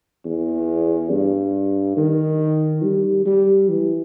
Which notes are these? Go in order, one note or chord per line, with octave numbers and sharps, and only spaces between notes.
E2
G2
D#3
G3
G3
E3